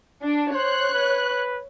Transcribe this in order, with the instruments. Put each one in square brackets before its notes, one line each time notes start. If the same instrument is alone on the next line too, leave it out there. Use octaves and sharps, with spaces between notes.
[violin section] D4
[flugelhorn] C5 [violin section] C#5 F#6
[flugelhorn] B4